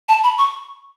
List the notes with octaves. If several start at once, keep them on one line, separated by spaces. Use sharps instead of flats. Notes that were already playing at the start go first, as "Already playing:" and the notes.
A5
B5
C#6